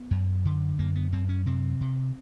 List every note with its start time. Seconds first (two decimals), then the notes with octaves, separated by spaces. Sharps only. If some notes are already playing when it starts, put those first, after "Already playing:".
Already playing: B3
0.11 F#2
0.45 D3
0.79 F#2 A#3
0.96 B3
1.12 F#2 C4
1.29 C#4
1.46 C3 C4
1.81 C3